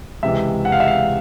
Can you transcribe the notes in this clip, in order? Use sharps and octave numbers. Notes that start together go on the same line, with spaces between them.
C#2 C3 E3 G#3 E5
F#5
F5
E5
F5